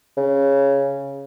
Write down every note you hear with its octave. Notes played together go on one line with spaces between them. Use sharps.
C#3